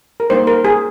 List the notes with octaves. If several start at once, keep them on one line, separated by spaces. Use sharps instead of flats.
A#4
G3 A#3 D#4 C5
A#4
G#4